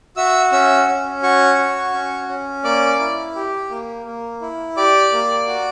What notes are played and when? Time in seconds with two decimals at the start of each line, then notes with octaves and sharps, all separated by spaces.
0.17 F#4 E5 E6
0.52 C#4 E5 E6
0.88 C#4
1.23 F#4 C#5 C#6
1.59 F#4
1.93 C#4
2.28 C#4
2.64 A#3 D5 D6
2.99 E4
3.35 G4
3.70 A#3
4.06 A#3
4.41 E4
4.77 G4 D5 D6
5.12 A#3
5.47 F#4